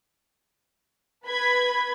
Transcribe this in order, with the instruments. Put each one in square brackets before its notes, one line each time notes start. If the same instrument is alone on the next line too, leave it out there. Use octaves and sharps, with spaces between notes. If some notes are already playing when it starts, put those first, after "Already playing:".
[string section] B4 B5 G#6